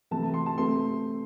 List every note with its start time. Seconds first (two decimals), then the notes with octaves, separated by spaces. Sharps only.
0.11 C3 E3 A3 A5
0.23 A5
0.34 C6
0.46 A5
0.57 C3 A3 C4 C6